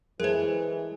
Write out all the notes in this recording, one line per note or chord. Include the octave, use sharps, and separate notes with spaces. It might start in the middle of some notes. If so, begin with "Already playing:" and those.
E3 G#3 A4 A#4 C5